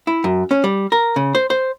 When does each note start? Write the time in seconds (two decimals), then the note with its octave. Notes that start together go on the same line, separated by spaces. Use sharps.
0.07 E4
0.24 F#2
0.51 C#4
0.64 G3
0.92 A#4
1.16 C#3
1.35 C5
1.50 C5